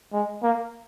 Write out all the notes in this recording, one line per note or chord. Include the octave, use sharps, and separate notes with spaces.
G#3
A#3